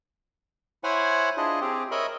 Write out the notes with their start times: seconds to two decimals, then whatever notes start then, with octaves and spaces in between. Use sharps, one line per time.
0.84 E4 C5 C#5 F#5 G#5
1.37 D4 E4 F4 G#4 D#5
1.61 C4 G4 G#4
1.91 A#4 C#5 D#5 E5 B5